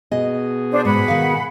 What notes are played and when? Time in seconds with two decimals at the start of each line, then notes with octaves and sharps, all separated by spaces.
0.12 B2 G#4 D#5
0.70 D4 C5
0.85 G#2 F#5 B5
1.08 D#3 F5